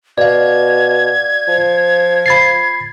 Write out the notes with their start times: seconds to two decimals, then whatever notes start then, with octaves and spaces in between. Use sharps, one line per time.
0.18 B2 D5 F5 G#6
1.48 F3
2.26 B5 A6 C7